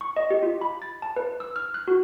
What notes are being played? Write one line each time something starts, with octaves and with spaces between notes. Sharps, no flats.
C#6
D#5
G4
F4
B5
A6
A5
B4
E6
F6
F#6
F#4